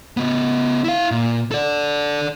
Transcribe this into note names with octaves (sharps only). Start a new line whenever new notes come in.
C#3 B3
E4 F5
A#2
A4 D5